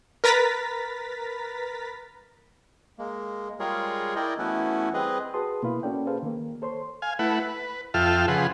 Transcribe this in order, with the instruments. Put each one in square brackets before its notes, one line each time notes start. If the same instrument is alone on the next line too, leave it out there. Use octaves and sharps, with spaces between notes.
[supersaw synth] A#4 B4 A#5 A6 B6
[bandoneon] G#3 A#3
G3 G#3 F4 G#4 A#4 C#5
E4 A#4 D5 D#5 G5
E3 A3 B3 C#4 E4 F#4
G3 C4 G#4 B4 D#5
[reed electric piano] F#4 G#4 B4 A5 C6 D#6
B2 A#3 E4 B4 F5 B5
A#3 C#4 F#4 A4 D5 G5
G#4 A4 B4 C5 F5
D#3 A#3
A4 C5 C#5 C6
[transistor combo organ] F5 G#5
A3 E4 B4 F#5
B4
F2 F4 A4 E5 G5 F6
C#3 F3 G#4 B4 F#5 C6